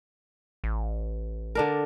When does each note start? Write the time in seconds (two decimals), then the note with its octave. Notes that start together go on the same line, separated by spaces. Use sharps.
0.64 A1
1.55 D3 D4 A#4